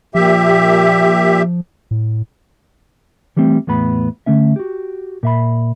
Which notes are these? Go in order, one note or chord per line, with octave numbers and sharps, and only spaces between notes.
A#2 F3 G4 E5
A2
E3 G3 A3 C4
E2 A2 B3 B5
D3 A3 C#4 E5
F#4 G4
A#2 E5 B5